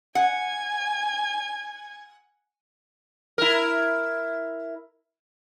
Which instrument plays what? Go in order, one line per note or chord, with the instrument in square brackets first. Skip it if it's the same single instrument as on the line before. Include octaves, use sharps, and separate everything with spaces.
[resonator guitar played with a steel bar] F#5 [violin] G#5 G#6
[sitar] E4 A#4